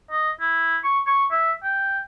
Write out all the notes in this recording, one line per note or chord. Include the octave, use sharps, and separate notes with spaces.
D#5
E4
C#6
C#6
E5
G5